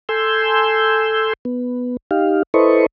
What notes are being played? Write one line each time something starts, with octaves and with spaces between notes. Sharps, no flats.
A4 G#5 C6 E6 G6
B3
D#4 G4 F5
E4 A4 B4 C5 D#5 C#6